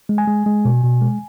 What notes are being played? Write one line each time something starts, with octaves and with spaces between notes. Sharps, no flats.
G#3
G#5
G#3
G#3
B2
B2
G#3